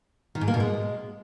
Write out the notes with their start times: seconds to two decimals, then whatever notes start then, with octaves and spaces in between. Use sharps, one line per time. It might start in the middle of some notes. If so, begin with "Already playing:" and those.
0.35 D#3
0.41 G#2
0.48 A#3
0.54 B2
0.60 G#3